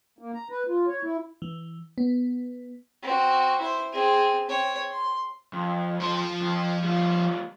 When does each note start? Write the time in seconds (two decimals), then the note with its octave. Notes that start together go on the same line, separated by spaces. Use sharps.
0.19 A#3
0.34 A#5
0.50 B4
0.68 F4
0.87 C#5
1.02 E4
1.42 E3
1.98 B3
3.03 C4 F#4
3.61 E4 C5
3.93 C4 G#4
4.48 C4 C#5
4.92 C6
5.53 F2
6.00 F3 C6
6.41 F2
6.84 G3 F4